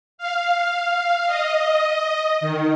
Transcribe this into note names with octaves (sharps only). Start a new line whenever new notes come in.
F5
D#5
D#3